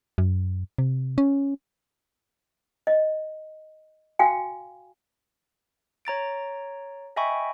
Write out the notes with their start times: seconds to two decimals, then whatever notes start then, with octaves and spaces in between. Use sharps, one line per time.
0.18 F#2
0.78 C3
1.18 C#4
2.87 D#5
4.19 F#4 F5 G5 G#5
6.05 C#5 A#5 A6 D7
7.16 D#5 E5 G5 G#5 B5 C#6